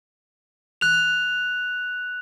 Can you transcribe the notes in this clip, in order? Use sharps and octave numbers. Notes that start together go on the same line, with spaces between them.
F#6 F7